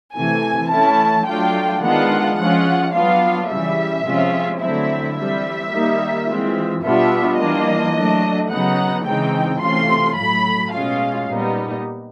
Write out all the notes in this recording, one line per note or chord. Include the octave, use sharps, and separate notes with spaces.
C3 E3 A3 G#5
E3 A3 C#4 E4 A5
F#3 A3 D4 F4 G5
D#3 G#3 B3 D4 F4 F#5
F3 G#3 C#4 F4 F#5
F#3 B3 D4 F4 F5
C#3 E3 G3 E5
C3 F3 G#3 C#4 F4
D3 F#3 A3 C4 E4 E5
E3 G3 C4 E5
D#3 G3 A#3 D#4
E3 G#3 C4 F4
B2 G3 B3 D4 F4 E5
E3 G3 A#3 D4 F4 D#5
F#3 A3 D4
C#3 F#3 B3 D#4 F#5
C#3 E3 G#3 C4 D#4 G5
C3 E3 A3 C#4 F4 C6
A2 F#3 A3 B5
B2 G#3 C#4 F4 F5
A#2 G3 B3 D#4